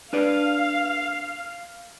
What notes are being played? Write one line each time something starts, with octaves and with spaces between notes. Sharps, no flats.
D4 B4 D5 F5